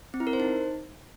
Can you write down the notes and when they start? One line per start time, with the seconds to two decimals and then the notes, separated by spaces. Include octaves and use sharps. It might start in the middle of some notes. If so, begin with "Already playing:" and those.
0.14 C4
0.20 E4
0.27 A#4
0.33 C5
0.40 D#4